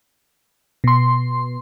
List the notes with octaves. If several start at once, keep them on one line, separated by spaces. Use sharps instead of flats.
B2 C6